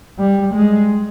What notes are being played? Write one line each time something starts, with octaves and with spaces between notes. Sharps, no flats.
G3
G#3